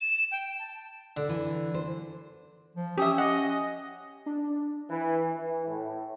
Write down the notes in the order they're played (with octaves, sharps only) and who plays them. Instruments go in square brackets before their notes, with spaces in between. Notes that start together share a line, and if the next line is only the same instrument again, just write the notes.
[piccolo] E7
G5
A5
[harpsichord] D3
[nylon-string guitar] E3
C5
[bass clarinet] F3
[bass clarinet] C#4 [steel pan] G4 E5 [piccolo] D#6
[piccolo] D#5 [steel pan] F#5
[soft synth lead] D4
[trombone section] E3
E3
A2